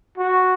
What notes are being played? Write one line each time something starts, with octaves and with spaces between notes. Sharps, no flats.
F#4